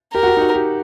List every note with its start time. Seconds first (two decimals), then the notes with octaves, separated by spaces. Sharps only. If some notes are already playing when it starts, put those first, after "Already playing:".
0.14 G4 A#4
0.23 F#4
0.28 G4
0.37 D#4
0.41 F#4
0.54 G4